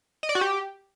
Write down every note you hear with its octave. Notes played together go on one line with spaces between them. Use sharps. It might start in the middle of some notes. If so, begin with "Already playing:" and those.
D#5
D5
F#4
G4